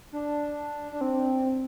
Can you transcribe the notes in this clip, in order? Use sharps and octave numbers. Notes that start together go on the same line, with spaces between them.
D4
D4
C4